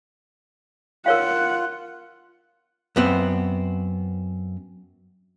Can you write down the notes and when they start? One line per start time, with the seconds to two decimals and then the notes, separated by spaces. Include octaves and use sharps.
1.06 F4 A#4 C#5 F5 F#5
2.96 F#2 B3 C4